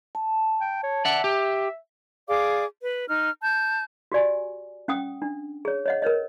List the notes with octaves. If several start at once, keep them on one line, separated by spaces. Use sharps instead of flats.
A5
G5
C#5
D5 E5 F#5
G4
G#4 D5 F5 D6
B4
D#4 F6
A5 G6
F#4 G4 D5 G#5
C#4 F#5 G5 D#6
D4
G#4 C#5
C#5 D#5 F#5
A#4 B4 C#5 D#5